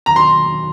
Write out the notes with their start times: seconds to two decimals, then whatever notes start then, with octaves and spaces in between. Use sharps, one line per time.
0.06 D#2 D#3 F#3 A#5
0.16 C6